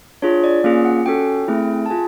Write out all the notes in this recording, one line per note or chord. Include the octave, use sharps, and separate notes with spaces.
D4 F4 G#4 C#5
D5
A#3 C#4 F4 G#4 F5
F#5
C#4 F#4 A4 G5
A3 C4 E4 G#4
A5
F4 G#4 G#5